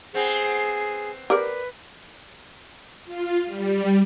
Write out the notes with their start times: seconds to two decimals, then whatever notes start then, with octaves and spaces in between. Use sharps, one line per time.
0.14 B3 C4 G#4
1.30 G4 A#4 B4 D5
3.05 F4
3.46 G3